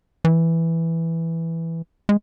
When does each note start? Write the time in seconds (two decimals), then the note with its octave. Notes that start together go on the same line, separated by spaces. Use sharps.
0.25 E3
2.09 G#3